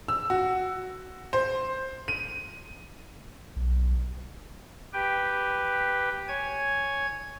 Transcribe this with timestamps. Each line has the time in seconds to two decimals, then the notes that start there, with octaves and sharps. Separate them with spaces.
0.08 E6
0.30 F#4
1.33 C5
2.08 D#7
3.56 B1
4.93 G4 B4 G5
6.28 C#5 G#5 G#6